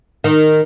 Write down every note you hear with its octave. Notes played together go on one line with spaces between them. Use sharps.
D#3